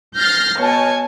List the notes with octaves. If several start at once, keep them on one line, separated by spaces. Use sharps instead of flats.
F6 G6 A6 A#6 C7
B2 C#5 G#5 A5